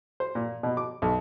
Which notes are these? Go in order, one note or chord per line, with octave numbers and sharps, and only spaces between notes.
C5
A#2
B2
D6
B1